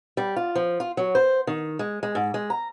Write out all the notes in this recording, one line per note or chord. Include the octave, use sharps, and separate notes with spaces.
G3
F4
F3
F4
F#3
C5
D#3
G#3
G#3
G#2
G#3
A#5